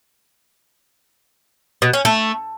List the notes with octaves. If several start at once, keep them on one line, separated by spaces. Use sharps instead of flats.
B2
C#4
A3